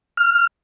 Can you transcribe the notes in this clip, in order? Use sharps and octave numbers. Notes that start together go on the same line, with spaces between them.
F6